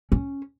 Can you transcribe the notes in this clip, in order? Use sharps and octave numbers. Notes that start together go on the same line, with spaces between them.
C#4